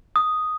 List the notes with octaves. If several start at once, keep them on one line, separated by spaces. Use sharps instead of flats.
D#6